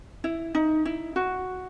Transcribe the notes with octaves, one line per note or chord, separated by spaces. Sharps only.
E4
D#4
E4
F#4